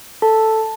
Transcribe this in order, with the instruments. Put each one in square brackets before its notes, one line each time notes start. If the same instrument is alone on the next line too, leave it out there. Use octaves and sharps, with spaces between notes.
[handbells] A4 A5